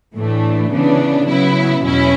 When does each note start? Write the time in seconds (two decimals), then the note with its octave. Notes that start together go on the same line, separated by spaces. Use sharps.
0.15 A2 E3 A3 D4
0.71 C#3 E3 B3 D4
1.27 C#3 F#3 B3 E4
1.83 E2 B2 F#3 C#4 E4